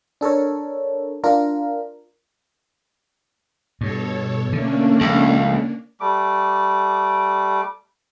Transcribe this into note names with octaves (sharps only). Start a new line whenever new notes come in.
D4 A4 A#4 C#5
D4 F4 A#4
G2 B2 A4 C#5
D3 A3 A#3 C#4 D4
C#2 F3
G3 A3 D6